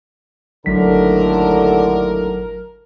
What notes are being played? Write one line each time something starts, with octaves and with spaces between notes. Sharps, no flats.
G#1 D#2 A2 D3 F#3 A#4 B6